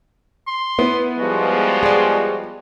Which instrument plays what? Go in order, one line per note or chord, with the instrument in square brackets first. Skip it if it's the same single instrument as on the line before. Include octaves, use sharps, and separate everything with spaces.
[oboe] C6
[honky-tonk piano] B3 [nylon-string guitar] E4
[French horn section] F3 G3 G#3 [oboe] F#4
[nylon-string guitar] G#4 D5